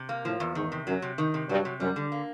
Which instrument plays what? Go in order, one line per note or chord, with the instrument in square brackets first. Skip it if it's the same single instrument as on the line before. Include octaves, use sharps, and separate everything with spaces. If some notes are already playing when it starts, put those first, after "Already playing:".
Already playing: [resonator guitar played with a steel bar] C3
A#3
[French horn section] A2 [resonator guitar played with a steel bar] F3
[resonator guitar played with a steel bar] E2
[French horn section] G#2 [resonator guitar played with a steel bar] D#3
[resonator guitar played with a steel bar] C3
[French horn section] F#2 [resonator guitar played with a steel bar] F#3
[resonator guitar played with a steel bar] C3
D#3
C3
[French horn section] G2 [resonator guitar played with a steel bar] F#3
[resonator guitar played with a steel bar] C3
[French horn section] F#2 [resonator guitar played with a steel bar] G3
[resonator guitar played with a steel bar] D3
A#3